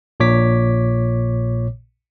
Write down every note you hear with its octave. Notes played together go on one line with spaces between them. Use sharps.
A#1 A#2 C#5 D6 B6